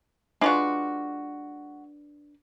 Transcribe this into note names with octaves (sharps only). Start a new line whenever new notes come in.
G#3 D4 F4 F#4 B4